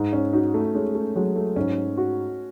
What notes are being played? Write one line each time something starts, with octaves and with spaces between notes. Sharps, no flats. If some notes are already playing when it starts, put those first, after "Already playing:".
Already playing: G#2
C#4
D#4 F#4
A3
G#3 C#4
A3
F#3 G#3
A3
G#2 C#4
F#4